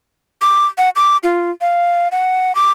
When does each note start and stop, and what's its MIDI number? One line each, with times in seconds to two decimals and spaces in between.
0.42 0.66 86
0.78 0.90 78
0.96 1.17 86
1.23 1.51 65
1.61 2.08 77
2.12 2.55 78
2.55 2.72 86